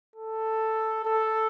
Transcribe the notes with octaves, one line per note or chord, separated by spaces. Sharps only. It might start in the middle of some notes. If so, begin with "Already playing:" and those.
A4
A4